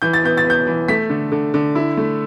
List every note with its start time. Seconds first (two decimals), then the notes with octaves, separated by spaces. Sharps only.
0.02 E3 G6
0.13 A6
0.24 B3 G6
0.37 A6
0.45 B3
0.50 G6
0.67 E3
0.88 A3 B6
1.10 D3
1.32 D3
1.54 D3
1.75 E4
1.97 A3